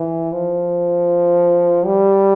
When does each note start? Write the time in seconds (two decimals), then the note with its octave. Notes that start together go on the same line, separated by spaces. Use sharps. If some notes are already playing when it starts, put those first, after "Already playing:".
Already playing: E3
0.32 F3
1.86 G3